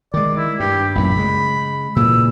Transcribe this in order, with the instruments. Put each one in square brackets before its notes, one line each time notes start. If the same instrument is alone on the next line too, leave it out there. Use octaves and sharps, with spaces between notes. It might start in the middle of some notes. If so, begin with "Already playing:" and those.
[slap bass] D#3 G#3 [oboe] D5
[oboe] E4
[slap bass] G2 [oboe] G4
[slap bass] A1 F#2 A#2 [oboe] B5
[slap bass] C#3 G#3
[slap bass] A#2 C#3 E3 [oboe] E6